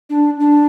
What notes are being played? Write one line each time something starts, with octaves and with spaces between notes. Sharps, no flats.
D4
D4